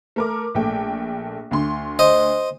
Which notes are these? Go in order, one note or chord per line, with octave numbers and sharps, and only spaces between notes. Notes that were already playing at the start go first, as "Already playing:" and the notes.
A3 A#4 D6
A#1 A3 G5
D2 D3 C6
C5 D#5